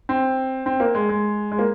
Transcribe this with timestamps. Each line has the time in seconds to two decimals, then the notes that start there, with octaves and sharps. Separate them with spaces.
0.09 C4
0.66 C4
0.80 A#3
0.95 G#3
1.09 G#3
1.52 G#3
1.59 A#3